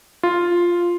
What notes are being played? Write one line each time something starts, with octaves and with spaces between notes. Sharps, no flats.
F4